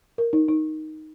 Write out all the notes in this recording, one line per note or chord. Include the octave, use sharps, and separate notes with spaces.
A#4
D#4
D#4